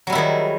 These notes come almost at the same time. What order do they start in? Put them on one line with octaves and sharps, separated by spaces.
F#3 G3 E4 D#3 G#4